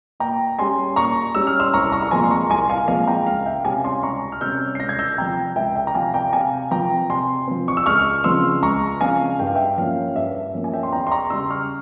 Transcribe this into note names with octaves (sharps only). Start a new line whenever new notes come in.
A#2 G5 A#5
G3 C#4 G#5 C6
A#2 A#5 C#6
G3 C#4 E6
F6
C6 E6
C2 A#5 C#6
A#5 C#6
A#5
A#2 F3 G#3 C4 G#5 C6
C6
A#5 C#6
C2 G#5 C6
F5 G#5
A#2 F3 G#3 C4 F5 G#5
G5 A#5
C#2 F5
E5 G5
C3 G3 C#4 F5 G#5
G#5 C6
C#2 A#5 C#6
F6
C3 G3 C#4 E6 G6
C7
C#2 G6 A#6
G#6
E6 G6
C3 F3 G5 A#5
C#2 E5 G5
E5 G5
A#5
C3 F3 F5 G#5
G5 A#5
C3 F5 G#5
F3 C4 G5 A#5
C3 G#5 C6
F3 C4
C#6
E6
C#2 C#6 F6
C#3 F3 C4 C6 E6
C#2 A#5 C#6
C#3 F3 C4 F5 G#5
G2 G5
F5
E5 G5
F3 A#3 C#4 F5
G2 E5
E5
F3 A#3 C#4
G#5
E5 G5
C6
E2 G5 A#5
C6
A#5 C#6
C#3 G3 C6 E6
C#6 F6